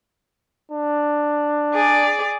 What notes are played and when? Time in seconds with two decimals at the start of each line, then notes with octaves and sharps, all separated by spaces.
0.71 D4
1.73 G#4 D5